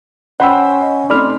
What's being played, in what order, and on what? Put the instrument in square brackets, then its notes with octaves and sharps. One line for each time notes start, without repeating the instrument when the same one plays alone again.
[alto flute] C#4 [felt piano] C5 G5 [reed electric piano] F#5 B5 E6
[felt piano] D#5
[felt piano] A3 C4 [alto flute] D#4 [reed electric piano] D5 B5 F6